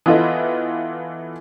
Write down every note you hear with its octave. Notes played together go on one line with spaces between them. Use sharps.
E3 B3 F4 A4 D#5